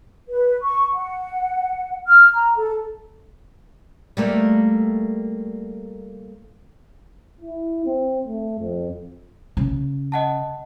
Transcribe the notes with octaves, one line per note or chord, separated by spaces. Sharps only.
B4
C#6
F#5
F6
A#5
A4
G3 A3 A#3
E4
C4
A3
F2
C#3
D#5 F#5 A5